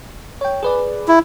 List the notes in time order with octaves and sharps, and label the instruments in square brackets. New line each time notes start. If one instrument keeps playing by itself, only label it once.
[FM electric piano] C#5 G5
G#4 B4 D5
[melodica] E4